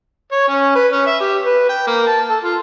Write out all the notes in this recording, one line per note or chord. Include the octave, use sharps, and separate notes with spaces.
C#5
C#4
B4
C#4
E5
G4
B4
G5
A#3
A5
A4
F4